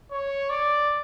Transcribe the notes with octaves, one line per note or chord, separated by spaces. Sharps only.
C#5
D5